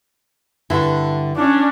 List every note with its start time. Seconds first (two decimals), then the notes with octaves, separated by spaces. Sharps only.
0.70 G2 D3 E4
1.36 C#4 D4